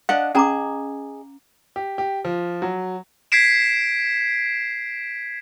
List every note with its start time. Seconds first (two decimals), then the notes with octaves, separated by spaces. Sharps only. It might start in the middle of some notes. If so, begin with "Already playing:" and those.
0.09 D4 D#5 F5 F#5
0.35 C#4 G#4 D#5 A#5 D6
1.76 G4
1.98 G4
2.25 F3
2.62 F#3
3.32 G#6 B6 C7 D7 E7